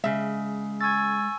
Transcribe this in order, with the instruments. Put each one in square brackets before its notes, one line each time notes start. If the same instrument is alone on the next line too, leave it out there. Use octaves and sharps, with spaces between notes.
[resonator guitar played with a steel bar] C#3 E5 [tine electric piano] G#3
[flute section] G#5 C#6 E6 [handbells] G#6 A6